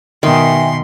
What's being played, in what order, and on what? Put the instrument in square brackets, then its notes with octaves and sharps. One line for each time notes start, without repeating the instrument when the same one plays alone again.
[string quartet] B2 C6 [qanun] D#3 [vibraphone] E5 G5 G#5